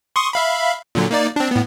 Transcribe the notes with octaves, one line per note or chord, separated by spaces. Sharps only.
C6 C#6 D#6
E5 F5 B5
A#2 D3 F#3
A#3 D#4 D5
C4 D4
A2 B3